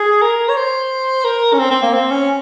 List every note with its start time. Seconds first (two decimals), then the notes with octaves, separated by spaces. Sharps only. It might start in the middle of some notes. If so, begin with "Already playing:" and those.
Already playing: G#4
0.22 A#4
0.49 C#5
0.57 C5
1.25 A#4
1.53 C#4
1.59 C4
1.71 C4
1.82 A#3
1.93 C4
2.11 C#4